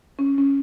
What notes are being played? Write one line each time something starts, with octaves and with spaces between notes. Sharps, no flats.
C#4
C#4